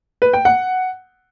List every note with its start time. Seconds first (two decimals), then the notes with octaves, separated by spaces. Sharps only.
0.22 B4
0.33 G5
0.45 F#5